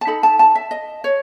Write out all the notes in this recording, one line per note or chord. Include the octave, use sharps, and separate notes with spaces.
A5
D#4 A4 B5
A5
A5
E5
D#5
C#5